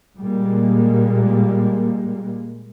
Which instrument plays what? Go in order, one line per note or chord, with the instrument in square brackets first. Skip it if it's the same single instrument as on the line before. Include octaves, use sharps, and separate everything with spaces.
[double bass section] A#2 G3 G#3 A#3